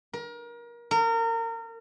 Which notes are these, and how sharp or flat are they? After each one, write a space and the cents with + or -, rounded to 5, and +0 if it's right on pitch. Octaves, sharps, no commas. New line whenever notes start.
A#4 +30
A#4 -30